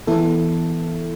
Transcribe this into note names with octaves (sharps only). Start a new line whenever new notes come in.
E3 B3 E4 A4